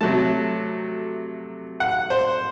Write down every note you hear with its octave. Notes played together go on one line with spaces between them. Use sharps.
C3 F#3 A3 A5
F#5
C5